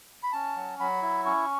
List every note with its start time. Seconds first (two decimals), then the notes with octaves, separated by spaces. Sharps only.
0.23 B5
0.33 C#4 A5
0.56 F#3
0.79 F#3 B5
1.02 E4
1.26 C#4 C#6